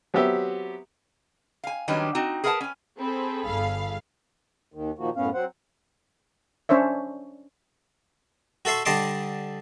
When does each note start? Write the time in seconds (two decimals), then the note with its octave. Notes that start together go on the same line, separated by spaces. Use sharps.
0.14 F#3 B3 C4 G4 E5
1.64 F5 G#5
1.88 D#3 F#3 G3 C#4 D4 B4
2.15 C4 D#4 F#4
2.44 G#4 A#4 B4 F5 F#5 A5
2.61 C#4 G#5
2.98 C4 G#4 A4 B5
3.46 G1 F5
4.74 D#2 D#3
4.98 A#2 D#3 F3 A#3 F#4
5.16 F#2 A2 B3 C#4 F5
5.34 F#3 C4 C5 F#5
6.69 C#4 D4 C5 C#5 E5
8.65 F#4 A4 E5 C6 C#6
8.85 D3 G3 D#5 A5 C6 D6